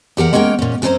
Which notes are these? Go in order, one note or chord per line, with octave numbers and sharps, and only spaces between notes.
E2 G4 A#4 F#5
G#3 A#3 C#4 A#4 G5
A#2 C#4
F#2 A3 C4 C#4 C5 A#5